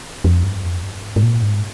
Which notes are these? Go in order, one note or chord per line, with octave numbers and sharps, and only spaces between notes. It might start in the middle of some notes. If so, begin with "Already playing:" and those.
F2
G2
F2
G2
G#2
G#2
A#2
G#2